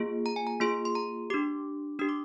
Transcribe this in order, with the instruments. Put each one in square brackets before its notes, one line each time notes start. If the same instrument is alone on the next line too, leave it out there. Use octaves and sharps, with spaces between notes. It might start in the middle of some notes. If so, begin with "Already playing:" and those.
Already playing: [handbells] A#3 F4 G#4
A#5
G#5
A#5
A#3 F4 G#4 C6
C6
A#5
D4 G4 D6
D4 G4 D#6
D6